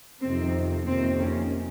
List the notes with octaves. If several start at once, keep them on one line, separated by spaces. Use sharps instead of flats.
F2 C3 D#3 C4
F2 C3 D#3 A#3 C4
C#4